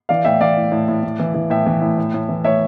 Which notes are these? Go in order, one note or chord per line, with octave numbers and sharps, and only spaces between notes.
E3 D5 F5
A2 E5 G5
E3 D5 F5
A2
A2
A2
A2
E3
E3
A2 E5 G5
E3
A2
A2
A2
E3
A2 C#5 E5